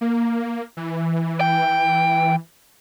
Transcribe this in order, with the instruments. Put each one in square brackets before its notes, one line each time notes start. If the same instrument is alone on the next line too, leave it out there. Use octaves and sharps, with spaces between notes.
[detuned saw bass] A#3
E3
[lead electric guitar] G5